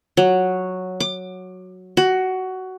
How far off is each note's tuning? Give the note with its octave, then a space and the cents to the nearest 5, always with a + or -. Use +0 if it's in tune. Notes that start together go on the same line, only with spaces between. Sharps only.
F#3 -5
D6 +25
F#4 +15